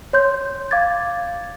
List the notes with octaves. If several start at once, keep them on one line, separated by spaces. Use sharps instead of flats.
C#5 C6 G6
F5 D6 G#6 A6